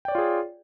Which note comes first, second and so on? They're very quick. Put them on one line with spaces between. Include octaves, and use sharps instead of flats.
G5 D5 C#5 F4 G#4